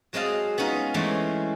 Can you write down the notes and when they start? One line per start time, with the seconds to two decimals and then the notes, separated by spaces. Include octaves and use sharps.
0.13 F#3 G#3 C4 D#5 F5 A5
0.58 B3 C#4 D#4 F4
0.94 E3 G#3 A3 C4 C#4